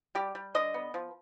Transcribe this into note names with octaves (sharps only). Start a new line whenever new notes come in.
G3 G4
G3
D3 D#5
B3
F3